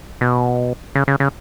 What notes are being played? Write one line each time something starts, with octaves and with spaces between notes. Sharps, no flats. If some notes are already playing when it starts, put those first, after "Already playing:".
B2
C#3
C#3
C#3